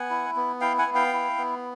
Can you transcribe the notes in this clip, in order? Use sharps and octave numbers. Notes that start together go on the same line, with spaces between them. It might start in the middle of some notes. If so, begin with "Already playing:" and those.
Already playing: B3 F#5 G#5
E4
B3
E4 F5 G5
F#5 G#5
B3
F5 G5
E4
B3